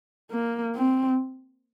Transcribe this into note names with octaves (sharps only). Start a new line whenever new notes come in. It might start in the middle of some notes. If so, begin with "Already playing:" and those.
A#3
C4